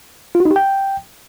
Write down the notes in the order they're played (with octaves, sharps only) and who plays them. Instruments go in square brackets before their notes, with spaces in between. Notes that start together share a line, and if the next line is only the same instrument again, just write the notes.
[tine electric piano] F4
F#4
D#4
G4
G5